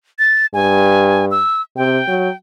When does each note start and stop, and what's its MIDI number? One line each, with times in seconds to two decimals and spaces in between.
0.19 0.46 93
0.54 1.41 43
0.54 1.25 80
1.31 1.61 88
1.77 2.00 48
1.77 2.36 79
2.08 2.29 54